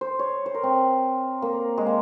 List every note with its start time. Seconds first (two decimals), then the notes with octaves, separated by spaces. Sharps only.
0.01 C5
0.19 C#5
0.46 C5
0.54 A#4
0.63 C4
1.42 A#3
1.78 G#3
1.86 A#3